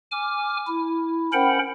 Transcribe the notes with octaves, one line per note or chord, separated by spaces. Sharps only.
G#5 D6 F6
E4
C#4 A#4 C5 F#5 G5 B5